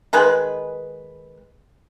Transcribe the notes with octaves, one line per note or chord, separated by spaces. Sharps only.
D#3 G#3 G#4 B4